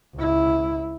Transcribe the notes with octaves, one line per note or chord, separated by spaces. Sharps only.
C#2 E4